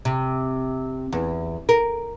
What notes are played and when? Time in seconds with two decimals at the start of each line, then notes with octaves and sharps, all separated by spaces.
0.05 C3
1.13 E2
1.69 A#4